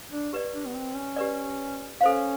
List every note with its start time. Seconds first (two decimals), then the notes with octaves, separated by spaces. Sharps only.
0.11 D4
0.33 G4 B4 D5
0.53 D4
0.67 B3
0.75 C4
0.95 C#4
1.16 G4 B4 D5
2.01 C#4 A4 C5 F5